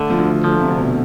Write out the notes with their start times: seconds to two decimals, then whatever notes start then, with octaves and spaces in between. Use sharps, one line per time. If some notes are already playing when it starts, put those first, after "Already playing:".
Already playing: D3 A3
0.10 F3
0.19 D2
0.44 D3 F3
0.61 C3
0.68 D2
0.78 B2